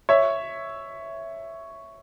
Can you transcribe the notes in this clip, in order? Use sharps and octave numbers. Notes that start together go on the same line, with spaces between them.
C#5 E5